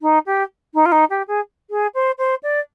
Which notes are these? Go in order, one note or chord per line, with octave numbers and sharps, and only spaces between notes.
D#4
G4
D#4
F4
D#4
G4
G#4
G#4
C5
C5
D5